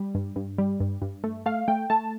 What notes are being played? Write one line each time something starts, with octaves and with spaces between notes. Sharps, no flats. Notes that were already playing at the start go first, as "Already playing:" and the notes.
Already playing: G3
G2
G2
G3
G2
G2
A3
A3 F5
A3 G5
A3 A5